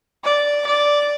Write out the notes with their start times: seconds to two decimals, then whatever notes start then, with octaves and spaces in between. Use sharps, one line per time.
0.24 D5
0.67 D5